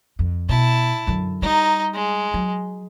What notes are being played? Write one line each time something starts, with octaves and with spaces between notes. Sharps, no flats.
F2
B2 E4 A5
F#2 D3
G3 D#4 A#5
G#3
F#3